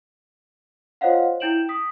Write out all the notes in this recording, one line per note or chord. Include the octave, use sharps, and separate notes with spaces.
F4 C5 C#5 D#5 F5 F#5
E4 G5 G6 D7 E7 F#7
D#6 B6